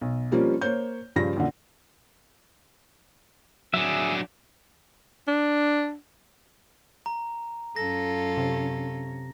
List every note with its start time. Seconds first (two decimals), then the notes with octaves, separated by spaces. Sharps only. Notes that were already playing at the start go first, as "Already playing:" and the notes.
0.01 B1
0.32 F3 G3 A#3 C4 C#4 F4
0.61 A#3 C5 C#5 G6
1.16 G2 C#3 F3 F4 A#6
1.36 F#2 A#2 D3
3.74 F#3 D4 G#4 E5
5.27 D4
7.06 A#5
7.76 F#2 C#4 F4 A4 A#6
8.37 C3